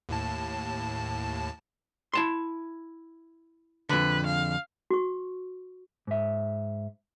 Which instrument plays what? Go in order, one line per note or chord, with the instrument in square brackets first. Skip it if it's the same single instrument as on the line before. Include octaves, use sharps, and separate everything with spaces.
[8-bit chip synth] D#2 A2 A5
[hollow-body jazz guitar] E4 A5 C6
[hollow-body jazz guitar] F2 D3 [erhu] B4
[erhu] F5
[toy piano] F#4 C#6
[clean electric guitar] G#2 E5